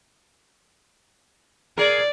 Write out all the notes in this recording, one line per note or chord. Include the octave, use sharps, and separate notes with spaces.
G#4 A#4 D5